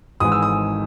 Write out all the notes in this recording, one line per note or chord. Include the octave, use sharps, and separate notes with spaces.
G#1 G#2 E3 G#3 D#6
E6
D#6